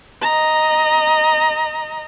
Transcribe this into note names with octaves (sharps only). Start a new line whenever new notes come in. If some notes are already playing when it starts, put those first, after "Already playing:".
D#5 A#5